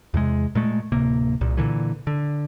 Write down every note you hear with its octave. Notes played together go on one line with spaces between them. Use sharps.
E2 C3 G#3
A#2 G#3 A3
D1 C3 A#3
C2 A#2
A#2 D3 E3
D3